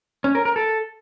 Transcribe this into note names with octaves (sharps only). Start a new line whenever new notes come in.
C#4
A#4
A#4
A4